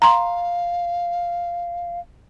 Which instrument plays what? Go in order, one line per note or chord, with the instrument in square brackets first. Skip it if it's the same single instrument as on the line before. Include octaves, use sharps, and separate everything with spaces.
[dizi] F5 [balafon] A#5 C6